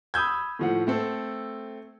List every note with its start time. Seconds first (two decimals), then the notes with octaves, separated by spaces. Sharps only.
0.14 B5 D#6 E6 G6 G#6
0.59 A2 F3 F#5
0.87 A3 C4 A4